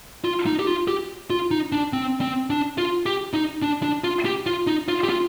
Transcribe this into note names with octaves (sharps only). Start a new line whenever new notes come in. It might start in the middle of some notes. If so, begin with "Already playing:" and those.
F4
D#4
G4
F4
G4
F4
D#4
D4
C4
C4
D4
F4
G4
D#4
D4
D4
F4
G4
F4
D#4
F4
G4
F4